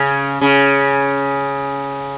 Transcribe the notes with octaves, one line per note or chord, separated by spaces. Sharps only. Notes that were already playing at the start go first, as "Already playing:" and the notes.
Already playing: C#3
C#3